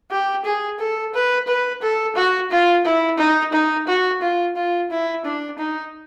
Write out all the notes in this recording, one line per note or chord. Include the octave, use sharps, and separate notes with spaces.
G4
G#4
A4
B4
B4
A4
F#4
F4
E4
D#4
D#4
F#4
F4
F4
E4
D4
D#4